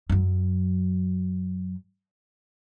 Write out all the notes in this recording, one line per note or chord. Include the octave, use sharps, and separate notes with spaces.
F#2 F#3